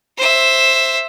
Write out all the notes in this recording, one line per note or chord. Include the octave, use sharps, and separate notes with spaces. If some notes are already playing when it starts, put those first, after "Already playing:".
C5 E5